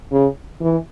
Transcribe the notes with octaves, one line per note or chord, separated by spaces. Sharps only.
C#3
E3